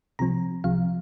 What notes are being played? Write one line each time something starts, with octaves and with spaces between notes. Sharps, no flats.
C2 C3 F3 C4 A#5
C2 C3 F3 F5